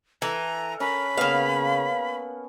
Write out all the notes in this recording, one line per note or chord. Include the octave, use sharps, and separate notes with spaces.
E3 A4 A#5
C#4 A#4 B5
C#3 A#3 B3 F5